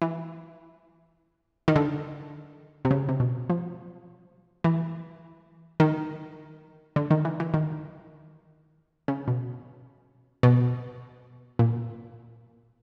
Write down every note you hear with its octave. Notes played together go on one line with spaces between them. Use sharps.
E3
D#3
D3
C3
C#3
C3
B2
F3
E3
D#3
D3
D#3
E3
E3
D#3
C#3
B2
B2
A#2